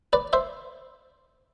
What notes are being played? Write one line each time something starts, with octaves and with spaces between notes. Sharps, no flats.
B4 D5
C5 E5